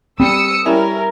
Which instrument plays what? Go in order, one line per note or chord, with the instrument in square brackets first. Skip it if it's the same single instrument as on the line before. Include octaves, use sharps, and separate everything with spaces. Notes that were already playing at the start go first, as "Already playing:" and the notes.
[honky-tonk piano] G3 [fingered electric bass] C4 [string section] D#6 E6 C#7
[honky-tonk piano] G3 C#4 E4 [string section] A#4